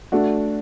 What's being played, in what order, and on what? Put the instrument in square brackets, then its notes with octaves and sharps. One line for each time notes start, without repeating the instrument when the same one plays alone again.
[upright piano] A3 D4 F#4